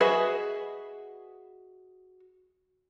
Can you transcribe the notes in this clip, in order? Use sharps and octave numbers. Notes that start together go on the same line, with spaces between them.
F#4 G#4 B4 D#5 E5